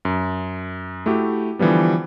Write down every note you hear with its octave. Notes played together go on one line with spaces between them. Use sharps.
F#2
A3 E4 F#4 G4
D3 E3 F3 G3 B3